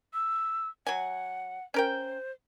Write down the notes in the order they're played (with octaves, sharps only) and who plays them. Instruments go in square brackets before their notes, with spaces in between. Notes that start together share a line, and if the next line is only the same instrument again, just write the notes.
[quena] E6
[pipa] F#3 G#5 [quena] F#5
[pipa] C#4 A#4 G5 [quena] C5